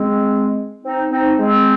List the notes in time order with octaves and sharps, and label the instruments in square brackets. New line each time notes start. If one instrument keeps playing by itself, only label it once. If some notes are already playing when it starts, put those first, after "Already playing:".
Already playing: [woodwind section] G#3 C4
C4 D#4
C4 D#4
G#3 C4